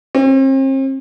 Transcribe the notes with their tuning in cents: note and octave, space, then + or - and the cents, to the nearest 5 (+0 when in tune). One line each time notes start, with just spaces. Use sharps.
C4 +40